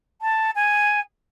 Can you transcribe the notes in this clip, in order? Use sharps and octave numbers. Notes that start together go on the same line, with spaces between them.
A5
G#5